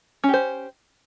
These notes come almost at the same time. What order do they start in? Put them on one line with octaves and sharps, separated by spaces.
C#4 G4 C5